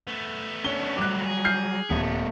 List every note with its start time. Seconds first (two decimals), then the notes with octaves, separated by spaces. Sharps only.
0.08 A3 B3
0.65 C#4 D4 C#5 G7
0.97 F#3 G3 D6 F#6
1.25 G#4
1.45 F6 G6 C7
1.90 D#1 A3 B3